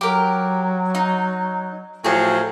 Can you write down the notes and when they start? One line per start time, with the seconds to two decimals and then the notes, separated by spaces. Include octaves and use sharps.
0.01 F#3 G4 A#4
0.95 D#4
2.04 A2 F3 F#3 G#4 C#5